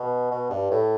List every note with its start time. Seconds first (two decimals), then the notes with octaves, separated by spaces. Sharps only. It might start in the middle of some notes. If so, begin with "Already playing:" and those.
Already playing: B2
0.31 B2
0.50 G2
0.71 A2